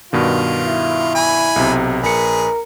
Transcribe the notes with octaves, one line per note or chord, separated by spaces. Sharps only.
G2 B2 D#3 F4
E4
G#5 B5
B1 C3
A#1 G#4 A#4 B4 C#7